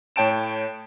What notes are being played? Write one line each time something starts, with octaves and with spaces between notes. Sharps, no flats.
A2 C#5 G5 A5 D7 E7